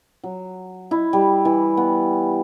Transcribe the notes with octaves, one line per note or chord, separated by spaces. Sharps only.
F#3
E4
G3
E3
B3